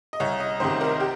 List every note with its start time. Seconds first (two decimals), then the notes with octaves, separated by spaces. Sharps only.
0.13 D#5
0.20 C2 C#5
0.40 D#5
0.60 C3 D#3 C5
0.81 A#4
1.00 G4